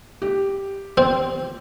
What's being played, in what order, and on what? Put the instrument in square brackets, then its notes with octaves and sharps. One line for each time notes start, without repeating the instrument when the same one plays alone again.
[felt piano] G4
[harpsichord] C4